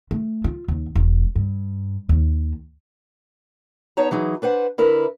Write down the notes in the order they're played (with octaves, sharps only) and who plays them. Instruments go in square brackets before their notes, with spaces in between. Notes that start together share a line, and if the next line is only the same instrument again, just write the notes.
[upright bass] A3
F4
D#2
E1
G2
D#2
[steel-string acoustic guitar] B3 D#4 C#5 A5 A#5
E3 F#3 D#4 G#4
D4 B4 C5 F#5
D3 E4 A#4 B4